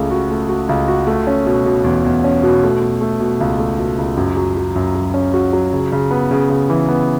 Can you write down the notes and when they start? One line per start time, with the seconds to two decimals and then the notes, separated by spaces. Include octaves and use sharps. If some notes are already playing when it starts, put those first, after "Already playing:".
Already playing: C#2 C#3 A3
0.11 F#4
0.31 A3
0.49 F#4
0.69 C#2
0.88 F#4
1.07 A3
1.27 C#4
1.46 B2
1.65 B2
1.84 E2
2.05 E2
2.24 C#4
2.43 B2
2.63 A3
2.81 B2
3.01 A3
3.20 B2
3.41 C#2
3.59 A3
3.79 B2
3.98 C#2
4.17 F#2
4.37 F#3
4.57 F#3
4.76 F#2
4.95 F#3
5.14 C#4
5.34 F#4
5.53 F#3
5.72 C#3
5.92 C#3
6.11 B3
6.31 C#3
6.50 C#3
6.69 E3
6.89 B3